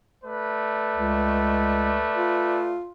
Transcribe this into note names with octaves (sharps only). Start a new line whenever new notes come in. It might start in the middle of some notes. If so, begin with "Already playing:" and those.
A3 B4 D5
C#2
F4